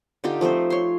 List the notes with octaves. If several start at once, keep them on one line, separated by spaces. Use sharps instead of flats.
D3 D#4 F4 G4
F3 A3 C4 C5
C#5 C6